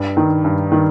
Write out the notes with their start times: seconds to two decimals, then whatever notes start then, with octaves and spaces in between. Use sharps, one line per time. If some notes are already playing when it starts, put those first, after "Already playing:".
Already playing: G2
0.17 D#3
0.45 G2
0.72 D#3